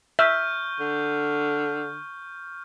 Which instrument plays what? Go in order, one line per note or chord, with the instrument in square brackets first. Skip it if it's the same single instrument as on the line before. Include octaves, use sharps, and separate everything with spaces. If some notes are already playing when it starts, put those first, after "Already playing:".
[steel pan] E5 [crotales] C#6 F6 G6
[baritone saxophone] D3